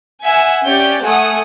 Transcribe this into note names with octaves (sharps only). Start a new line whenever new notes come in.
E5 F#5 G#5
C#4 G4 D5 G6
A3 F#5 G#5 D#6